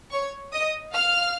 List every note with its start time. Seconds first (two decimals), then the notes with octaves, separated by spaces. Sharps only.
0.11 C#5 C#6
0.53 D#5 D#6
0.94 F5 F6